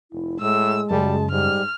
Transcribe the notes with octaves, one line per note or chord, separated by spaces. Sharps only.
F1 E4
A2 G#3 E6
F#2 C#3 G3 A5
G#2 G3 F6